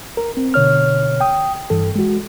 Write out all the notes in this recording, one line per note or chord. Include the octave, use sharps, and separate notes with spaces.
A#4
C4
B2 D3 C#5 F6
G5 D#6
G2 E3 A4
G#3 F#4